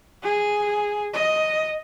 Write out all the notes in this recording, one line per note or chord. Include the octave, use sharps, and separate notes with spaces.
G#4
D#5